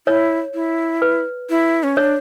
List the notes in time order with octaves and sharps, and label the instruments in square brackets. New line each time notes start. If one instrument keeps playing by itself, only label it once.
[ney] E4 [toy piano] C#5
[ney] E4
[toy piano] B4
[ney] E4
C#4
[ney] D4 [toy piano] C#5